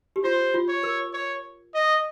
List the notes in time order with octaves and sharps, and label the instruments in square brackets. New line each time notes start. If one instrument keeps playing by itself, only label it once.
[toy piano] G4
[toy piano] F4 [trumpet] C5
[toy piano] F4
[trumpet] C#5
[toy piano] A#4
[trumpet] C#5
D#5